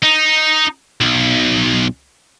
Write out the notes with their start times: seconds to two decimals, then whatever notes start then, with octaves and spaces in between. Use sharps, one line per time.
0.03 D#4
1.01 B1